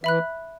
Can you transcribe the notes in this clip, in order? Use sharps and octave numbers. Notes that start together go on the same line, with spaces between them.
E3 E5 B5 F#6